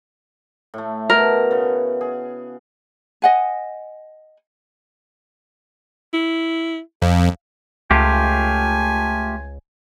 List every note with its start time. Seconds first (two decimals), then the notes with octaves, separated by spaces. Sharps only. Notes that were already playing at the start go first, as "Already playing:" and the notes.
0.74 A2 A3
1.10 B2 A#4 A5
1.51 C#3 B3
2.01 G#4
3.22 D#5 F#5 G#5
6.14 E4
7.02 F2 F5
7.91 C#2 A3 F4 G4 G#5